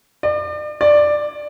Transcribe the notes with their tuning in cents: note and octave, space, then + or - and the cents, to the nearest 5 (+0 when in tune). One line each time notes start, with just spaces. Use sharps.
D5 +40
D5 +10